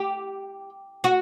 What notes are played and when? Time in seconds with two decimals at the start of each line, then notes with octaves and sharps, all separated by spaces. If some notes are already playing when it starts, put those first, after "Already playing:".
Already playing: G4
1.04 F#4